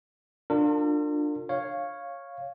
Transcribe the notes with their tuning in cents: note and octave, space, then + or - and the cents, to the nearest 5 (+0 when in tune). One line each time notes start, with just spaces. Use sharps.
D4 +20 F4 +25 A#4 -45
C#5 -5 F5 +0